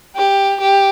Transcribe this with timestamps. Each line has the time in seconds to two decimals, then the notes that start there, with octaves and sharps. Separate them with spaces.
0.16 G4
0.61 G4